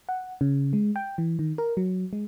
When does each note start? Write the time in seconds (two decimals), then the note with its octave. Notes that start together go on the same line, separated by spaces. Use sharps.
0.09 F#5
0.41 C#3
0.73 G#3
0.96 G5
1.18 E3
1.39 D#3
1.58 A#4
1.77 F#3
2.13 G#3